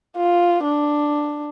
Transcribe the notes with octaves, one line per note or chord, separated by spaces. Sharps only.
F4
D4